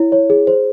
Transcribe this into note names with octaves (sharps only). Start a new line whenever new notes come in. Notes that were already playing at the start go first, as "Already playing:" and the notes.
Already playing: E4 C#5
C#5
G#4
C5